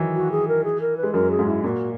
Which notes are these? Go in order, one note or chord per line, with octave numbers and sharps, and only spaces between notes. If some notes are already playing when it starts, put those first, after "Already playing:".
Already playing: D#3 E3 F#3
F#4
G#4
A#4
G#4
A#4
B4
G#3
F#2 F#3 A#4
G#4
G#2 G#3
E4
A#2 A#3 F#4